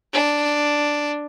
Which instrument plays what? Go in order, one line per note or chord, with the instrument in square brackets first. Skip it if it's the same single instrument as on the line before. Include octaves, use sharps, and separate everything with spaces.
[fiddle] D4